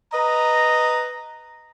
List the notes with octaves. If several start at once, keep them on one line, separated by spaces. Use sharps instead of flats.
B4 D#5 A#5